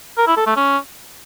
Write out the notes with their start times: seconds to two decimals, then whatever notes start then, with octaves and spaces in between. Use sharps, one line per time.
0.18 A#4
0.27 E4
0.37 A4
0.47 A3
0.56 C#4